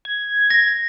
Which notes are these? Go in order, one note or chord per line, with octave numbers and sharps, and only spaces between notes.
G#6
A#6